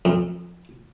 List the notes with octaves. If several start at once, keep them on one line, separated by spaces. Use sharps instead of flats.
F2